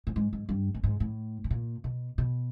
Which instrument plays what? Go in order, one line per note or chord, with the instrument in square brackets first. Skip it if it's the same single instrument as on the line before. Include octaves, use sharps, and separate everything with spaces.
[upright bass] A2
G#2
G#2
G2
A2
G#2
A2
A2
A#2
B2
B2